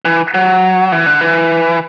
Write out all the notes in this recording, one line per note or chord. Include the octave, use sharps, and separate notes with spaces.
E3
F#3
E3
D3
E3